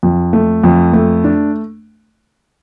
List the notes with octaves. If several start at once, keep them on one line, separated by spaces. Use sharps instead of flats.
F2
A3
F2
A3
D4